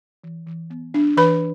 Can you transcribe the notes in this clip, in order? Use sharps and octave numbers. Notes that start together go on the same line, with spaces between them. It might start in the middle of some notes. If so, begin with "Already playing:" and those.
E3
E3
B3
D4
E3 B4 B5